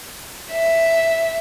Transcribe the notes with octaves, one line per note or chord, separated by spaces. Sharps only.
E5